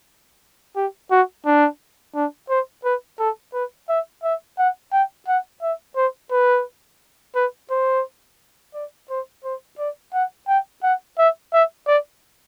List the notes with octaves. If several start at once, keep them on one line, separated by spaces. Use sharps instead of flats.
G4
F#4
D4
D4
C5
B4
A4
B4
E5
E5
F#5
G5
F#5
E5
C5
B4
B4
C5
D5
C5
C5
D5
F#5
G5
F#5
E5
E5
D5